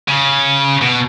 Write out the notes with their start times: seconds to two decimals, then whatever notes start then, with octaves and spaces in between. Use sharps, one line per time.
0.09 C#3
0.82 B2